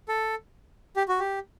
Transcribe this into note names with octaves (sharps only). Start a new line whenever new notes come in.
A4
G4
F#4
G4